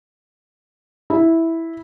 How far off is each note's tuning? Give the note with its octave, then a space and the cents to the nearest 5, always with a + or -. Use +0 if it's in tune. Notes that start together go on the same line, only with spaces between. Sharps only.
E4 -5